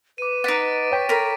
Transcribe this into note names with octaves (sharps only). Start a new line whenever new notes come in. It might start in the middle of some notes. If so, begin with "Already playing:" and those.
B4 D6 D#7
D#4 F#5 A6 B6 D7
C#5 G5 C#6 B6 D#7
A4 A#4 B5